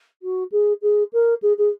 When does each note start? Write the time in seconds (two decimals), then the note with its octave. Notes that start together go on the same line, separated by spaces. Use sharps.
0.22 F#4
0.51 G#4
0.82 G#4
1.13 A#4
1.42 G#4
1.58 G#4